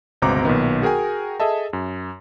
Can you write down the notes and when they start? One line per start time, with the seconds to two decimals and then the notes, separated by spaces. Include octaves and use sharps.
0.22 G1 C#2 B2 C4 A#5 D6
0.45 B1 A#2 D#3 B3
0.82 F#4 G#4 A#4 G5 G#5
1.40 G#4 A4 D#5 E5 A5
1.73 F#2